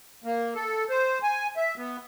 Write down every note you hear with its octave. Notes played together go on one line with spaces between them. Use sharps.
A#3
A4
C5
G#5
E5
B3